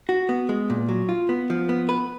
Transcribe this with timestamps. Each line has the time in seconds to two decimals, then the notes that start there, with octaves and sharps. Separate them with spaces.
0.09 F#4
0.29 B3
0.49 G#3
0.70 A#2
0.89 F#3
1.09 F4
1.29 B3
1.50 F3
1.69 B3
1.89 B4